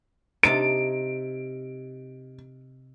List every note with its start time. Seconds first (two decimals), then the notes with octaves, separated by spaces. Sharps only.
0.43 C3 D#4 A5 D7